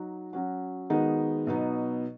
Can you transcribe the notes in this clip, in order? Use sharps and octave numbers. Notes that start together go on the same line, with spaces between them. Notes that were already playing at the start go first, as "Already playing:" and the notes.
Already playing: F#3 D#4 F#4
F#3 C#4 F#4
D#3 G#3 B3 D#4 F#4
B2 F#3 B3 D#4